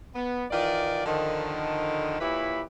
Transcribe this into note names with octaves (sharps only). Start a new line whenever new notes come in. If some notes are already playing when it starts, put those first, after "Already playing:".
B3
D#3 E3 F4 D5
D3 D#3 F3
A#2 E4 G4 B4 C#5 B5